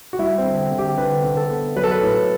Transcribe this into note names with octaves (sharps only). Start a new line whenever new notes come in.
F#4
G3 E4
C4
D3
C4
D3
G4
D3 B4
D3
A4
B3
F#3 B4
A4
B4
A2